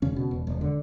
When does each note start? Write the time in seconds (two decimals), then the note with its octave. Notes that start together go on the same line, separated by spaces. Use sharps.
0.02 E1 C#3 C#4
0.16 B2
0.31 E1
0.47 E1
0.61 D3